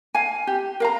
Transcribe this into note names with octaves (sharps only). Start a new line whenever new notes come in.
F5 G#5
G4
A#4 F5 A#5